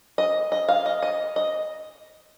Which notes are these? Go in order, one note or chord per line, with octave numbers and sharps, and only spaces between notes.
D#5
D#5
F5
D#5
D#5
D#5